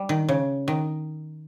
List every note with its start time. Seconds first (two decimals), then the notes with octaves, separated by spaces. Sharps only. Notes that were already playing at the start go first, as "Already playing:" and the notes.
Already playing: G3
0.09 D#3
0.29 C#3
0.68 D#3